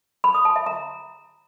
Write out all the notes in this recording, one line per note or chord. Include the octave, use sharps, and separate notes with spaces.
B5
D#6
A5
E5
A#5